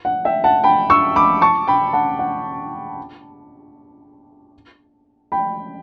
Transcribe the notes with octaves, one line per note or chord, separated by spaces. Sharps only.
F#5
E5 G5
F#5 A5
G5 B5
C#6 E6
B5 D6
A5 C#6
G5 B5
F#5 A5
F#5
G5 B5